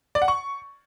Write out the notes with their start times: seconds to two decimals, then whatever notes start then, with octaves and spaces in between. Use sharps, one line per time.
0.15 D5
0.22 F#5
0.28 C#6